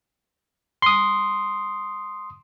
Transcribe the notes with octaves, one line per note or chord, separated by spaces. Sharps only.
C6 D#6